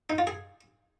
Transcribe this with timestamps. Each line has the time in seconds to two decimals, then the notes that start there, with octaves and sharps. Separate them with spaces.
0.10 D#4
0.18 F4
0.27 G#4